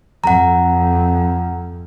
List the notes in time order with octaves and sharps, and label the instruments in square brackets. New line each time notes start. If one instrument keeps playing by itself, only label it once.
[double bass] F2 [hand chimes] F#5 A#5